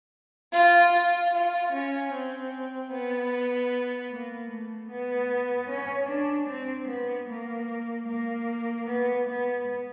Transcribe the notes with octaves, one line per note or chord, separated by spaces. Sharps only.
F4
F4
F4
C#4
C4
B3
A#3
A3
B3
C#4
D4
C4
B3
A#3
A#3
B3
B3